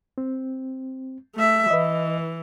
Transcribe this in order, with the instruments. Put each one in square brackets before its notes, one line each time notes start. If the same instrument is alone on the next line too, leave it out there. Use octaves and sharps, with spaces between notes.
[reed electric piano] C4
[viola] A3 E5
[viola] E3 [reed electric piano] B4 D#5